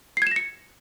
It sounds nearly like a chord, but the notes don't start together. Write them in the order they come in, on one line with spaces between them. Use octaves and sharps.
C7 G#6 E7 A#6 C#7